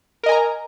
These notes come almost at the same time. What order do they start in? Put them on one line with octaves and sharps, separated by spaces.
A#4 D#5 G#5 A#5